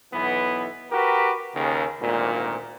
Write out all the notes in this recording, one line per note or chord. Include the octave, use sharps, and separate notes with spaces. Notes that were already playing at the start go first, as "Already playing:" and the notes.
B1 E3 B3
F#4 G4 A#4 B4
D#2 C#3
G#1 D2 A#2